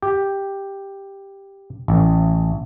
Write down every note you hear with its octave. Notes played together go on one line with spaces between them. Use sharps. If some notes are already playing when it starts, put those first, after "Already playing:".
G4
A1